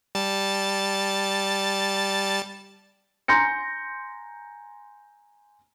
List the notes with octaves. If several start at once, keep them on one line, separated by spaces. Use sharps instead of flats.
G3 A5 A6
G#5 A#5 C6 G6 A#6 C#7